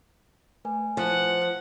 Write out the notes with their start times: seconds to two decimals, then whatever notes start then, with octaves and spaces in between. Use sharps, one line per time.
0.65 A3 B4 G#5
0.97 F3 F#5